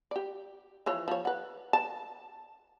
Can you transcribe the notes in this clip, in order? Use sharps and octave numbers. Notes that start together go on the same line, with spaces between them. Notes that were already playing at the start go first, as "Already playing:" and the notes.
G4 D5
E3 F3 C#5
F3 C#5
B4 F#5
A5